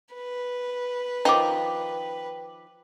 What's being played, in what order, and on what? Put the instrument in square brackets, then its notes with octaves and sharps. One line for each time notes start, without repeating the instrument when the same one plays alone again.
[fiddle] B4
[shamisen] D#3 F3 D#4 [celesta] G5 D6